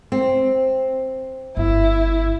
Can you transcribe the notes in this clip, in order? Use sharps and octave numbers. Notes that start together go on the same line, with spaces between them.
C4
G1 E4